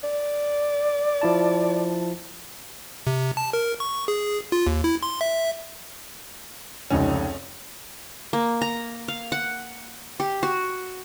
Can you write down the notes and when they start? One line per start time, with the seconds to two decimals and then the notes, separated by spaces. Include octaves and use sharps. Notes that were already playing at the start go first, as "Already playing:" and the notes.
0.04 D5
1.22 F3 E4 A5
3.07 C3
3.37 A5
3.53 A#4
3.80 C#6
4.08 G#4
4.52 F4
4.67 D#2
4.84 E4
5.03 C6
5.21 E5
6.90 F1 C#2 C#4 D#4
8.33 A#3
8.61 A#5
9.08 F5
9.32 F#5
10.20 G4
10.43 F#4